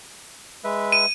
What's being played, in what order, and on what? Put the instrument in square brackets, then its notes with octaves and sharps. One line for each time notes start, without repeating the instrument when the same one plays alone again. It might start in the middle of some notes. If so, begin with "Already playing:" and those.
[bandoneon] G#3 B4 E5
[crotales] D#7